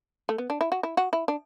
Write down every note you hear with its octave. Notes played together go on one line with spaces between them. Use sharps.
A3
B3
D4
E4
F#4
E4
F#4
E4
D4